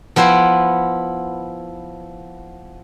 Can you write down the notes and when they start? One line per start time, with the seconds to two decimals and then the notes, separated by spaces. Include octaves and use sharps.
0.16 F3 B3 E4 C5 G5